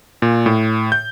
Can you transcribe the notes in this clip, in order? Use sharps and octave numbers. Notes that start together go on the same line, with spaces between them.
A#2
A2
G6